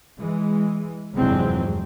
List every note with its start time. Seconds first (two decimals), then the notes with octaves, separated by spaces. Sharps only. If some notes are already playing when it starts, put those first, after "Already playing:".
0.20 E3 G#3
1.14 F1 E2 G2 F#3 G#3 C4